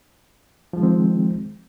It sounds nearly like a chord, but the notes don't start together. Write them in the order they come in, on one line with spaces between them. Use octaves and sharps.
F3 G#3 D#3 C4